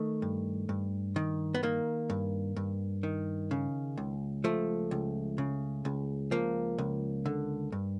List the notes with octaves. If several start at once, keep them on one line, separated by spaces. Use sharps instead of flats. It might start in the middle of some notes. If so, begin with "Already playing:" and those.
Already playing: D#3 A3
G2
G2
D#3
B3
D#3 A#3
G2
G2
D#3
C#3
C#2
F3 A3
C#2
C#3
C#2
F3 A#3
C#2
D3
G2